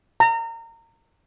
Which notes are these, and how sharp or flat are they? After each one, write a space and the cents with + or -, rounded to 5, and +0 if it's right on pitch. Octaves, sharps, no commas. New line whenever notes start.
A#5 -30